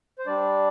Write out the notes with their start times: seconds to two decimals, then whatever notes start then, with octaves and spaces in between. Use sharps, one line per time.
0.19 C5
0.27 G3 D4 D5